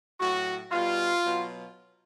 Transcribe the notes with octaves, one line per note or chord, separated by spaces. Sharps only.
A2 F#3 F#4
B2 G3 F4
B2 F#3